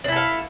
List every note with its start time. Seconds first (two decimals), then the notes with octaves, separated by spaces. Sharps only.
0.04 D4
0.08 E4
0.12 A4
0.16 F5